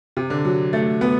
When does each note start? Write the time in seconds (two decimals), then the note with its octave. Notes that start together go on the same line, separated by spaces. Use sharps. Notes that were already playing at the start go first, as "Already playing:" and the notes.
0.17 C3
0.30 D3
0.45 F#3
0.73 A3
1.01 B3